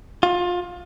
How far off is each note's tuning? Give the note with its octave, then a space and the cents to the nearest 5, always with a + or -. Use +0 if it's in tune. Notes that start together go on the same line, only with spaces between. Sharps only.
F4 +25